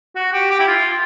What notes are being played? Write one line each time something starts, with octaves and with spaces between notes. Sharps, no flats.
F#4
G4
G4
E4
F4